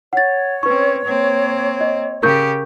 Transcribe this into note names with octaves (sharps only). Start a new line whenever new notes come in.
C#5 F#5 A6
C4 C#4 B4 C#6
A#3 C4
D#5
C#3 G4 A#4 C#6 G6